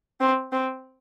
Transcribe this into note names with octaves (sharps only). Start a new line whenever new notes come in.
C4
C4